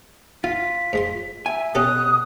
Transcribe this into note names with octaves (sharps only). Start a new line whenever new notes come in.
F4 F5 B6
G#2 G#3 C6
E5 G#5
B2 C#4 G4 A4 D#6 F#6